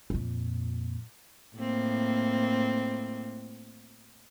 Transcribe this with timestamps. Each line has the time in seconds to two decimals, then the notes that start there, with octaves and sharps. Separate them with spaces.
0.10 F2 A#2
1.56 A2 A#3 C4